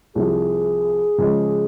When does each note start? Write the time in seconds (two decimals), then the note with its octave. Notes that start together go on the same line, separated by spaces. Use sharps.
0.15 C2 C3 F3 G#4
1.18 C#3 F3 G#3